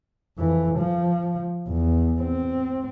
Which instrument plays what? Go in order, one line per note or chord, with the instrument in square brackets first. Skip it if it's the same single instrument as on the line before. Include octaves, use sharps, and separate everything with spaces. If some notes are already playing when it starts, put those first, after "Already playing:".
[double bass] F2 E3
F3
E2
C4